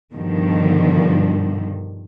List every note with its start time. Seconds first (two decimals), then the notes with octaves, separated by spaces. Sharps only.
0.14 G2 B2 D3 D#3 F3 G3